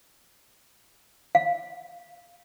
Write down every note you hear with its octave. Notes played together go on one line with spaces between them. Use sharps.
F5